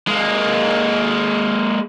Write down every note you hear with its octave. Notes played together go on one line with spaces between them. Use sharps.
G#3 A#3